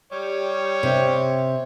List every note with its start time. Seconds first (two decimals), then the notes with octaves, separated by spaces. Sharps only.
0.12 G3 C#5
0.83 C3